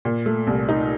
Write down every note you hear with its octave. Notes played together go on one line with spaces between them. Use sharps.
A#2
A3
C2
D#4